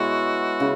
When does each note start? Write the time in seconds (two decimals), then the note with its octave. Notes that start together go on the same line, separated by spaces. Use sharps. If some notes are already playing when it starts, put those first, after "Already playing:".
Already playing: B2 G#3 E4 F#4 C#5
0.60 C#3